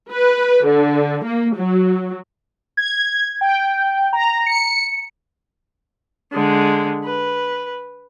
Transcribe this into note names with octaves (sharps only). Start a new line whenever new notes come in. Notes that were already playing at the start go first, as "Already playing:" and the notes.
B4
D3
A#3
F#3
G#6
G5
A#5
C#7
D3 G#3
B4